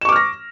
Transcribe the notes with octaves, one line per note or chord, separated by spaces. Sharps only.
C#6 D6 F6 A#6 E7